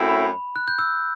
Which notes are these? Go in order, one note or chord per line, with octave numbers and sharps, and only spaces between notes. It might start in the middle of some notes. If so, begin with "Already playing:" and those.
Already playing: F#2 F#3 A3 C4 E4
B5
F#6
G6
E6